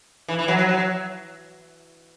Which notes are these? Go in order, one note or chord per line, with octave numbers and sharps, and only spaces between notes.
E3
E3
F#3
F#3
F#3